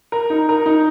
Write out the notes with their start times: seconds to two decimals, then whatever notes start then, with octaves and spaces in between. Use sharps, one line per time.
0.12 A#4
0.30 D#4
0.49 A#4
0.66 D#4